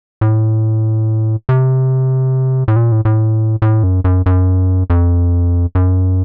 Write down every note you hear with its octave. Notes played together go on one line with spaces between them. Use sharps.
A2
C3
A2
A#2
A2
A2
A2
F#2
F#2
F#2
F2
F#2